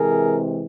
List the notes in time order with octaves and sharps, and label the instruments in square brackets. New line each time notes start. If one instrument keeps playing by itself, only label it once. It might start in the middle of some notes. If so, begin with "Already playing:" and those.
Already playing: [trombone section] C3 E3 G#3 C4 G#4 A#4